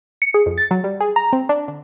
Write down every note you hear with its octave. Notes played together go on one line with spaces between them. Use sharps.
C#7
G#4
F2
A6
F#3
G3
G#4
A#5
C4
D4
D3